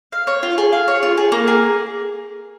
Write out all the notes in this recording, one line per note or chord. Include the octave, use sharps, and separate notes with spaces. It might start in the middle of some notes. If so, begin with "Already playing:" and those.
F5
C#5
F4
G#4
F5
C#5
F4
G#4
A#3
G#4